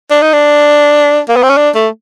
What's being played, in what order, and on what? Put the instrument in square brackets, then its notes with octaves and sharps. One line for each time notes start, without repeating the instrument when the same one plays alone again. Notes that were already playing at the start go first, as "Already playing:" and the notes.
[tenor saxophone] D4
D#4
D4
A#3
B3
C4
C#4
D4
A3